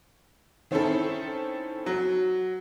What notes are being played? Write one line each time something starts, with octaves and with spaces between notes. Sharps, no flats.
D#3 C4 C#4 E4 A4
F#3